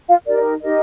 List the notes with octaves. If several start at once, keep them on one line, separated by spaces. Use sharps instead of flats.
F4 F5
D#4 G4 A#4 D5
D#4 G4 A#4 D#5